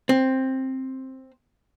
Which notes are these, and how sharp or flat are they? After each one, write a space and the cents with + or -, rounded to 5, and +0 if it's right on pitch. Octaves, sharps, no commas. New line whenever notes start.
C4 +10